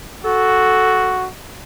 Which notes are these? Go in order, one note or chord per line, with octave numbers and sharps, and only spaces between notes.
F#4 A4